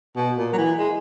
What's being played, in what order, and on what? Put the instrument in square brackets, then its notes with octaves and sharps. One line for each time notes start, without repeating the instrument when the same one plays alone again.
[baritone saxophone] B2
A#2
F#3
E3
G#3